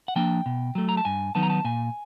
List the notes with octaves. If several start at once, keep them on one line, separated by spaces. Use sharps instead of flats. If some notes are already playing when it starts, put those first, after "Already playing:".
F#5
F3 A#3 D4 G5
B2
F#3 A3
A#5
A5
G2 G#5
D#3 F#3 B3 D#4 A5
A#5
A5
A#2 G#5